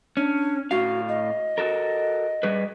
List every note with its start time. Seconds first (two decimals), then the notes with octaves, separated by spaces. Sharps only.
0.17 C#4 D4
0.71 A2 F#4 F5
1.08 D#5
1.58 F#4 A4 A#4
2.43 G3 G#4 B4